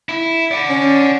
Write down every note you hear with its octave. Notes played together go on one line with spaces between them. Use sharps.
E4
D5 F#5
C#4